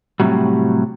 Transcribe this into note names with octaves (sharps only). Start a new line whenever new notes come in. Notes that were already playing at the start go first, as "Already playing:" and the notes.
A2 C3 F#3 G3